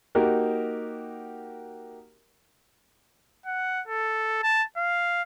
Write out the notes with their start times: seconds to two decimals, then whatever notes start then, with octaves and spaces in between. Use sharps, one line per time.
0.15 A#3 D#4 F#4 G4 A#4
3.46 F#5
3.88 A4
4.43 A5
4.77 F5